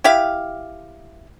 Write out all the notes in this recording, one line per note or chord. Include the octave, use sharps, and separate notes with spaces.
E4 G4 E5 F5